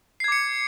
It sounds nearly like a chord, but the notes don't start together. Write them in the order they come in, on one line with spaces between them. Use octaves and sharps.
C7 G#6 D6 C#7